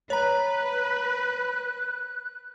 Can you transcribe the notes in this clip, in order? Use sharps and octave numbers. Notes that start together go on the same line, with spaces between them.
B4 C#5 A#5 F#6